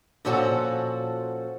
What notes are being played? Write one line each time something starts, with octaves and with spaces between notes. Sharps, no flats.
A#2 F3 C#4 F#4 A4